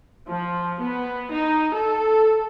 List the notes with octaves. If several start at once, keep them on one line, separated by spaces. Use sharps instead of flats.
F3
B3
D#4
A4